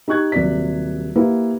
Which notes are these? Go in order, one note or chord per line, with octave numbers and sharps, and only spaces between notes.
D#4 G4 C#6 F#6 G#6
D#1 C3 F#3 D5 B6
A#3 E4 G4 B4